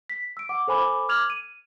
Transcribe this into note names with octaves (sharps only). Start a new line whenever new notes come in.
B6
E6 D7
F#5 D6
A4 C5 G#5 B5 D6
D6 F6 G#6 F7 F#7
D#7